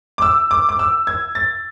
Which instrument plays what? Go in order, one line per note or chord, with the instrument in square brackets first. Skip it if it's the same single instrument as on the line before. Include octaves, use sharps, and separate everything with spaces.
[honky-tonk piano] D6
E6
D6
D6
E6
G#6
A6